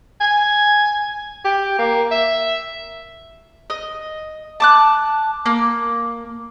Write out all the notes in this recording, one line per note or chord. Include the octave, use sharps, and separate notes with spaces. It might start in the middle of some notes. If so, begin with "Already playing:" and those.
G#5
G4
A#3
E5
D#5
A5 D6 F#6
A#3